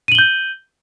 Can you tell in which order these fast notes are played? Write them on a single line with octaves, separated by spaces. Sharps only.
D#7 F#7 G7 G6